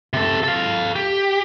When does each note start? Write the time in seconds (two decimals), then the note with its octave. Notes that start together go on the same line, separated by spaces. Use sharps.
0.13 C3 A4
0.44 A4 F5
0.96 G4